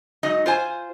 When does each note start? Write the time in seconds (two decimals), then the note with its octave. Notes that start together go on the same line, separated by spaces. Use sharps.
0.23 G#2 F#3 D#4 D#5
0.46 F4 C5 G#5